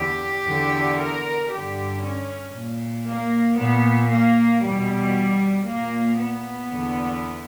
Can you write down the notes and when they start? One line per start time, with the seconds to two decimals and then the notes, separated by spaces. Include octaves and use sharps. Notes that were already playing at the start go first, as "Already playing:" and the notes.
Already playing: E2 D3 G4
0.46 E2 D3
0.98 A#4
1.50 G2 D3 G4
2.03 C#4
2.54 A#2
3.07 A#3
3.58 A#2 B3
4.10 A#3
4.62 E2 B2 G3
5.66 A#2 A#3
6.19 B3
6.70 E2 D3